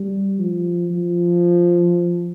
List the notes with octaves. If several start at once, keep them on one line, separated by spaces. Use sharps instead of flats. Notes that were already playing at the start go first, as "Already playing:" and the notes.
Already playing: G3
F3
F3